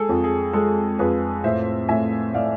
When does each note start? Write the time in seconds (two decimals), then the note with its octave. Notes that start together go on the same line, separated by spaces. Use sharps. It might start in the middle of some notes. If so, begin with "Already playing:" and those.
Already playing: G#3 G#4 A4
0.09 F2
0.24 G#4
0.53 G#3 A4
0.99 F2 G#4 B4
1.44 A2 C5 E5
1.89 A2 E5 G#5
2.34 A2 D5 F5